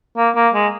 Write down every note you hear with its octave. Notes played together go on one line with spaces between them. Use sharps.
A#3
A#3
G#3